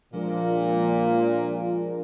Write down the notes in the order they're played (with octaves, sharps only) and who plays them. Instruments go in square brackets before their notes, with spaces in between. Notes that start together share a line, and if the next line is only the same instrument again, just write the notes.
[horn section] A#2 [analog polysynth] F3 G#3 D4 F4 A#4